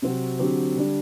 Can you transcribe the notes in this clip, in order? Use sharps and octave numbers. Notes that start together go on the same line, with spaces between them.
C3 F#3 C4 F#4
D3 F#3 C4 G4
D3 G3 D4